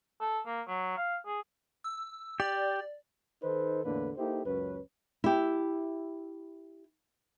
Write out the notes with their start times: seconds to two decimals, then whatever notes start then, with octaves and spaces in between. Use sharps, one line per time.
0.21 A4
0.46 A#3
0.68 F#3
0.97 F5
1.26 G#4
1.84 E6
2.40 G4 D5
3.43 D#3 D#4 A4 B4 C5
3.85 E2 A2 D3 A#3 D4 B4
4.17 A#3 D#4 E4 G4 A4 C5
4.45 C#2 F#2 C#4 B4
5.24 E4 G4